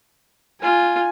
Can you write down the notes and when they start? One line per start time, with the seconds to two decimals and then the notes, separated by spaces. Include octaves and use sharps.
0.62 F4 G#5